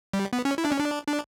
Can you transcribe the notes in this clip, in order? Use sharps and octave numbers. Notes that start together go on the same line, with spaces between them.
G3
B3
C#4
E4
D4
C#4
D4
D4